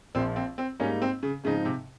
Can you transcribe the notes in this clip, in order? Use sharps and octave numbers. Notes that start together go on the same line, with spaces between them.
A#1 A#2 F3 C4
C4
C4
G#2 G3 A#3 C#4 D#4
C4
C#3
G#2 C#3 F3 C4 D#4
C3